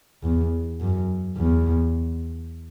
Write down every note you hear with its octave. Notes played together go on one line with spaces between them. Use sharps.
E2
F#2
E2